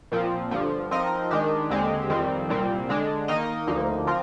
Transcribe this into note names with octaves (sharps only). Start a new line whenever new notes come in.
A#2 F3 C4
G2 D3 F3
F3 C4 D#4 A#4 D#5
D#3 G#3 D4 G4
D#2 D3 G#3 C4 G4
F2 D#3 G3 C4
C2 A#2 G3 C4
D3 G#3 D4
D#3 A#3 D#4 A#4 D#5
D2 D3 F3 A#3 D#4
F3 C4 F4 A#4